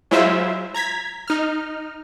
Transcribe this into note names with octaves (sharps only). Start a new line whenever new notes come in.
F#3 G#3 E4 F4 C5 E5
A#5 G#6 B6
D#4 F6